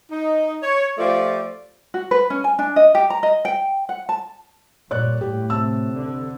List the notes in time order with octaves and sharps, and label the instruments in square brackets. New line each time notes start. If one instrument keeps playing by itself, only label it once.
[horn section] D#4
C#5
F3 A3 F4 G4 D5
[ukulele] F#4
B4
C#4
G#5
D4
D#5
G4
A#5
D#5
G5
F#5
A5
[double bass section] G2 A#2 [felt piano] C#5 D5 F#6
[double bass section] A2 [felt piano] G4
[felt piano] C3 A5 E6
[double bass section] D3